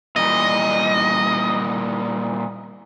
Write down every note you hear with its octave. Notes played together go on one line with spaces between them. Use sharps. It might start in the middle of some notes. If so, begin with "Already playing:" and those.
A#2 E3 G3 D#5